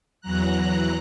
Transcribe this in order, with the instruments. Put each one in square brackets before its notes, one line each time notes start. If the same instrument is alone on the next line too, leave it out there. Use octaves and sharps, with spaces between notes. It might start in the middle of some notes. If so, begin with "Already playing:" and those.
[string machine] E2 E3 F#3 A#5 F#6